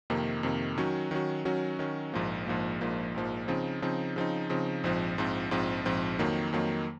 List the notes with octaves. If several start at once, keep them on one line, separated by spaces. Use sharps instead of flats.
F2 C3 D#3 A#3
F2 C3 D#3 A#3
D#3 F#3 C#4 F#4
D#3 F#3 C#4 F#4
D#3 F#3 C#4 F#4
D#3 F#3 C#4 F#4
A#1 G#2 F3 A#3
A#1 G#2 F3 A#3
A#1 G#2 F3 A#3
A#1 G#2 F3 A#3
C#3 F3 C4 D#4
C#3 F3 C4 D#4
C#3 F3 C4 D#4
C#3 F3 C4 D#4
A#1 G#2 F3 C4
A#1 G#2 F3 C4
A#1 G#2 F3 C4
A#1 G#2 F3 C4
F2 D#3 F#3 A#3
F2 D#3 F#3 A#3